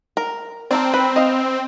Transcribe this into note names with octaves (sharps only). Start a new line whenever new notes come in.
A#4
C4 A4 A#4 D5
B4
D#5 F5